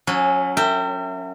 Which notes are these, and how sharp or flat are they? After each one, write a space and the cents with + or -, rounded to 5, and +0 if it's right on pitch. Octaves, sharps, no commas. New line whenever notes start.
F#3 -30 C#4 +0 A4 -25
A#4 -40 E5 -5 G5 +0